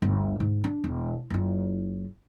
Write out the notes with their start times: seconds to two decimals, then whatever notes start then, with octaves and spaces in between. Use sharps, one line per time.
0.02 G1 D2
0.40 G#2
0.64 D4
0.84 E1
1.30 F#1 F4